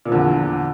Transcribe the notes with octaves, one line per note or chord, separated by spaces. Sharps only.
E2 A#2 D3 F3